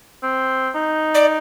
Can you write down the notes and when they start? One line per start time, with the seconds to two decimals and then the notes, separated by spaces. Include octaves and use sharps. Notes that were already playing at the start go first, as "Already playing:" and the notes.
0.23 C4
0.75 D#4
1.15 D5